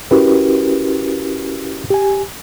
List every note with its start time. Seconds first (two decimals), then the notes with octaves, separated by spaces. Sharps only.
0.11 C#4 E4 F#4 G4 A#4 B4
1.90 G4 G#5